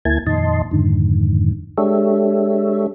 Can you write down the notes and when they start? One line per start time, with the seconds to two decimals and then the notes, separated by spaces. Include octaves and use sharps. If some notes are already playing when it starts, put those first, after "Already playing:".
0.05 D2 A#3 E4 G#5 A5 G#6
0.27 F2 A#2 D#3 D#5 A5 C6
0.71 F2 G#2 D3 D#3
1.78 G#3 D4 G4 A4 C#5 E5